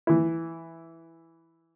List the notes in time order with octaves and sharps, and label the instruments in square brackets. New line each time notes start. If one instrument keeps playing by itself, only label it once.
[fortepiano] E3 E4